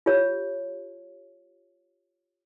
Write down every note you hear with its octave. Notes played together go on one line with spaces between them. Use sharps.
F4 G4 C#5